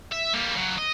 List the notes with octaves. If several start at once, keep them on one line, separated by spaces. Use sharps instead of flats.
E5
G3 A#3
C#3 F#3
D#5